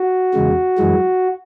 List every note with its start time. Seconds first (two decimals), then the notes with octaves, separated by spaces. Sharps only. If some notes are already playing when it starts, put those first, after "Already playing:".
Already playing: F#4
0.34 E2 C#3 G#3
0.78 F#2 E3 G#3